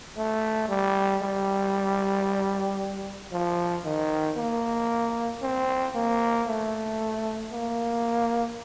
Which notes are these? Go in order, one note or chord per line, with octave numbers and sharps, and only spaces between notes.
A3
G3
G3
F3
D#3
A#3
C4
A#3
A3
A#3